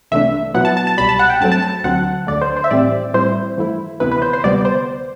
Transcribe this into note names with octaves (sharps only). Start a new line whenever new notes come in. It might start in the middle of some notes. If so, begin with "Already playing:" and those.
C2 C3 E3 A3 D4 E5
B2 F#3 B3 E4 F#5
A5
A5
A5
C2 B2 G3 B5
A5
F#5
G5
G2 F#3 A3 C4 A5
A5
A5
D2 D3 F#3 C4 F#5
D2 D3 A3 D5
C5
C5
E5
A2 E3 G3 C4 D5
A2 G3 C4 E4 C5
G2 E3 A3 E4
D2 C3 E3 B3 E4 B4
B4
C5
C5
D2 C3 G3 B3 D5
C5